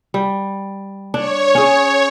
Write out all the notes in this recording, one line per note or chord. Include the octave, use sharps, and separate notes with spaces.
G3
D4 C#5
C#4 G#4